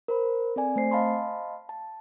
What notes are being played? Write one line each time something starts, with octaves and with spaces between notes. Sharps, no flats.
A#4 C5 B5
C4 A4 D5 G#5
A3 C4 C5 C7
D#5 F5 A5 B5 C6
A5